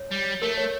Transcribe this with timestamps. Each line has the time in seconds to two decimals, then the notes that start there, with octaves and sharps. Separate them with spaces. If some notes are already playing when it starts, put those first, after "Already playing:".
Already playing: C#5
0.12 G3
0.42 A3 A#4
0.58 C#5